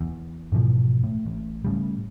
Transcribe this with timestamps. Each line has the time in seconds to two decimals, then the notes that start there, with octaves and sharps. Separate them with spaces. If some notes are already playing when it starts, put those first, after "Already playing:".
0.01 E2
0.52 G#2 B2 E3 F3
1.04 A2
1.26 A1
1.65 A2 C#3 G3